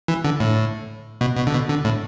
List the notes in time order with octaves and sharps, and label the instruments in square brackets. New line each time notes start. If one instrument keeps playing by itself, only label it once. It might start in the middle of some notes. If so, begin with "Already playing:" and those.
[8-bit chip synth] E3
D3
A2
B2
B2
D3
B2
D3
A2